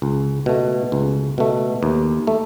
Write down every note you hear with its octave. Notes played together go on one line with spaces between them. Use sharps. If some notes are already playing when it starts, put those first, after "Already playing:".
C#2
B2 A3
C#2
B2 A3
D#2
A3